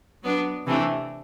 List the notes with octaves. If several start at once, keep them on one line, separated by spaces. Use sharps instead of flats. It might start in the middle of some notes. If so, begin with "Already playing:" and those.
F#3 B3 D4
C3 E3 A3 D4